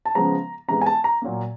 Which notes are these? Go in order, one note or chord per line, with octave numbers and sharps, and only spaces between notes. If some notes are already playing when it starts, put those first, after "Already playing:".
A5
C#3 F3 G#3 B3 A#5
C3 E3 G#3 B3 A#5
G#5
A5
A#5
A#2 F#3 A#3